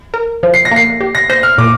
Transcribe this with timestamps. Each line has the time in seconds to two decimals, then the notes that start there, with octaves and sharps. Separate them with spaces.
0.14 A#4
0.43 F3
0.54 C7
0.65 A#6
0.71 A#3 C7
1.01 G4
1.15 A#6
1.30 C5 A#6
1.43 F6
1.58 A#2 D6